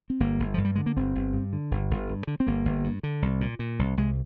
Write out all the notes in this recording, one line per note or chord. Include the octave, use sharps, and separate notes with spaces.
C4
G1 A#3
G1
G2 F3
G3
D3 G#3
A#3
G1 C4
G1
G2
D3
G1
G1
G2
D3
C4
G1 A#3
G1
G2
D3
C2
A#2
A#2
C2
C2 G#3